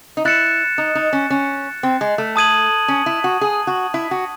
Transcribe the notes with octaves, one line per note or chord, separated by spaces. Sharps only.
D#4
E4 F#6 A6 C#7 E7
D#4
D#4
C#4
C#4
C4
G#3
A3
A5 D#6 G#6 D#7 F#7
C#4
E4
F#4
G#4
F#4
E4
F#4